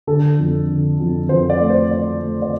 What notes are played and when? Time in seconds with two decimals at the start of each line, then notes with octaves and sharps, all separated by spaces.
0.07 D3 A4
0.39 F2
0.69 D3
1.00 F2
1.29 F2 C5
1.50 D5
1.60 A3
1.70 C5
1.91 A3 D5
2.21 A3
2.42 D5